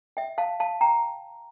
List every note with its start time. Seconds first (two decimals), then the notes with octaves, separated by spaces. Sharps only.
0.17 E5 G5
0.38 F5 A5
0.60 F5 A5
0.81 G5 A#5